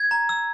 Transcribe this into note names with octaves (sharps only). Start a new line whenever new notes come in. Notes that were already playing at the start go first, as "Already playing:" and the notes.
Already playing: G#6
A#5
E6